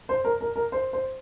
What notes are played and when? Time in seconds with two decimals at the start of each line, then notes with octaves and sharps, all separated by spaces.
0.09 C5
0.25 A#4
0.41 A#4
0.56 A#4
0.72 C5
0.93 C5